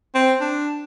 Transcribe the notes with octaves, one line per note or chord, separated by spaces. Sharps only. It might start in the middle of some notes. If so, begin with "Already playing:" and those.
C4
D4